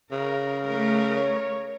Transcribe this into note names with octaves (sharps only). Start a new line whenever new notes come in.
C#3 A#4
A3 A#4
C#5